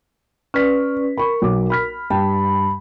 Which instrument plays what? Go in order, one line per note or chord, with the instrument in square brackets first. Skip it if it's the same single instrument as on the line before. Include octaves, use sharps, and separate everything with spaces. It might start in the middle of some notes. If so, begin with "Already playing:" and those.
[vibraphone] C#4 B4 D5 [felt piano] F6 B6
[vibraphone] A#4 [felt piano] B5 C#6
[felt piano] B1 D6
B5 F6 B6
[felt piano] G2 G5 A5 [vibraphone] B5